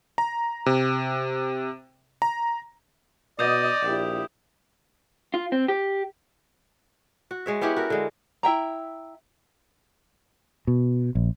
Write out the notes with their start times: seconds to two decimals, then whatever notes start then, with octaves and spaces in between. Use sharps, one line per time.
0.18 A#5
0.66 C3
2.22 A#5
3.39 B2 D5 D#5 D#6 G6
3.83 A#1 E4 G4
5.34 F4
5.52 C4
5.68 G4
7.31 F#4
7.46 G#3 C#5 E5
7.61 B3 C#4 E4 G4
7.76 F#4 A#4
7.90 D3 G#3
8.43 E4 E5 G5 A#5
10.67 B2
11.15 A#1